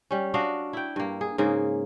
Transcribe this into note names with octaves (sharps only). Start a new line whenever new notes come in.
G3 C#4
D4 F#4 D#5 F5
E4 G5
G2 A#3
G#4
G#2 C#3 A#3 G#4